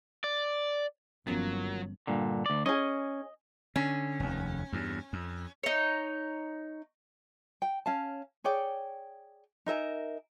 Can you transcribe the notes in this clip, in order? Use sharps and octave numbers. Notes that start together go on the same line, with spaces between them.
D5
G1 D#3 F3 F#3 A#3 B3 C#4
G2 A#2 D3
D2 D5
C#4 G#4 D#5
D3 C#4
F1 D#2
E2 G2
F2
D#4 C#5
G5
C#4 F5 A5
G#4 C#5 D5 G5
D#4 A#4 E5 G#5